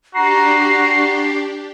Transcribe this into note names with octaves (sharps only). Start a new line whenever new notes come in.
D4 F#4 G4 A#5 C7